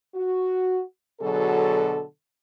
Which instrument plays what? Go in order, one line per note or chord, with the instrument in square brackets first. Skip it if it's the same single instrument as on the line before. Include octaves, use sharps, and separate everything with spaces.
[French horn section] F#4
B2 D3 F#3 G#4 A4